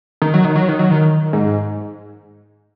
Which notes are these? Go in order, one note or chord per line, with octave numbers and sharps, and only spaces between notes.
D#3
F#3
D#3
F#3
D#3
F#3
D#3
G#2